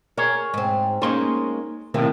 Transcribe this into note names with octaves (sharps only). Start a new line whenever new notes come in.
G#4 A#4 C#5
G#2 C4
G#3 A#3 C#4 D#4 C6
A2 C3 D#3 A#3 E4